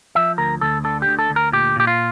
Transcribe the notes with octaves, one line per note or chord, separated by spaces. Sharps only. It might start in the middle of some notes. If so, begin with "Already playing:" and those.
F3 E5
D2 A#4
D2 A4
D3 A4
G4
D2
A4
D2
A#4
A#2 G4
A#2 G4
F4